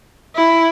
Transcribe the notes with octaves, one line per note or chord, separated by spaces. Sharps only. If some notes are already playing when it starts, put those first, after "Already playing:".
E4